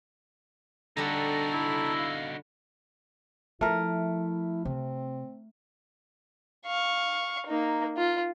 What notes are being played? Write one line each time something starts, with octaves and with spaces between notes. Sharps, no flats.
D3 G3 D#4 F#4 A4 A#5
E4
F5
F3 A3 E4 A#4
C3 C4
F5 C#6
A#3 D#4
F4